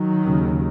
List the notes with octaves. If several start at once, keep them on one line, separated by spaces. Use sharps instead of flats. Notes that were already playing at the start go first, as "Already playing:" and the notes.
Already playing: D#3 F#3
D#2 C#3